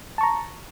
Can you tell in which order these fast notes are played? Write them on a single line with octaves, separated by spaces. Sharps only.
A5 C#6 A#5